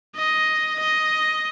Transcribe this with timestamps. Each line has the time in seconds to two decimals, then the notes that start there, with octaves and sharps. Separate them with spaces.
0.16 D#5
0.80 D#5